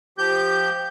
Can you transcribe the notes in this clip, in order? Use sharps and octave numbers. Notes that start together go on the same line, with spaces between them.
F3 G4 G6